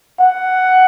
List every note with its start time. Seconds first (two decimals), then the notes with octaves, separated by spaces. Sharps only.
0.20 F#5